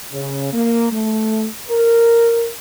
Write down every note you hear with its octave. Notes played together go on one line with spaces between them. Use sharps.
C#3
A#3
A3
A#4